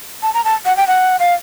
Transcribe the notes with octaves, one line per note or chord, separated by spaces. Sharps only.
A5
A#5
A5
F#5
G5
F#5
F5